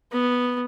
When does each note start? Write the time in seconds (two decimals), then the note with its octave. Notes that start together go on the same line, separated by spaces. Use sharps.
0.12 B3